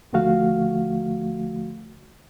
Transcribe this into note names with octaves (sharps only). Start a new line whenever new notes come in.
D#2 D3 F3 A3 F#4 F5